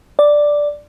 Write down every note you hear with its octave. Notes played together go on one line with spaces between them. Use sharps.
D5